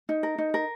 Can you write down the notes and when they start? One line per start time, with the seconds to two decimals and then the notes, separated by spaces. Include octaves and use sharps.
0.09 D#4
0.23 A#4
0.38 D#4
0.54 A#4